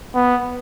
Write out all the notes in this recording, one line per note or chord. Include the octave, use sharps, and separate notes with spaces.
B3